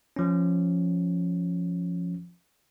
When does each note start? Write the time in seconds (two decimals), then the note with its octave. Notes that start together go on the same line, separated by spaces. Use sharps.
0.16 F3 C#4